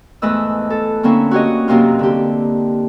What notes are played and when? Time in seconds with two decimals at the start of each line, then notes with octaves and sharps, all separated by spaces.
0.22 E2 G#2 A3 B4 D#5 E6
0.70 A4
1.03 D3 A#3 C4 C#4 E4
1.31 F#4 G4 C#5 D#5
1.68 F#2 C3 A#3 C4 F4
1.99 D3 G4